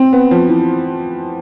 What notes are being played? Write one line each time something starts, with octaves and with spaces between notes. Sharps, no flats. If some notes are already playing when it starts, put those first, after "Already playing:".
Already playing: C4
B3
F3
E3